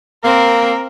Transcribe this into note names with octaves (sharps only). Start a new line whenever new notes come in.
A#3 C4 A#4